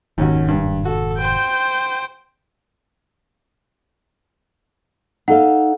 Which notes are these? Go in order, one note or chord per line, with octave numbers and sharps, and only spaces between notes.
F1 D#2 G#2 D#3 C#4 F#4
G2
F#4 A4
C5 G5
D#4 A4 F5 F#5